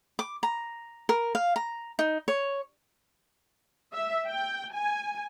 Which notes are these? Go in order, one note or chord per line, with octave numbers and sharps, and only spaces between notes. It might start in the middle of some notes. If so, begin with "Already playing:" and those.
D6
A#5
A#4
F5
A#5
D#4
C#5
E5
G5
G#5